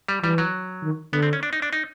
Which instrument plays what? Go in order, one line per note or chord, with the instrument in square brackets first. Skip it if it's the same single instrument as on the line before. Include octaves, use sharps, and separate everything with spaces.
[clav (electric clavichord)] G3
[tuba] E3 [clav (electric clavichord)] G3
[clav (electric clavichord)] F#3
[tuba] D#3
[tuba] D3 [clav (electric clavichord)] B3
[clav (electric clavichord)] C4
C#4
D4
D#4
D4
D#4